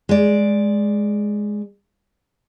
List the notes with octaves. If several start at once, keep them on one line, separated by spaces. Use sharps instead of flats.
G#3 D5